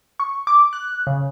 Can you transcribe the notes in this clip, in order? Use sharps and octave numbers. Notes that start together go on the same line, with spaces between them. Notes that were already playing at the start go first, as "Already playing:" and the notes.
C#6
D6
F#6
C#3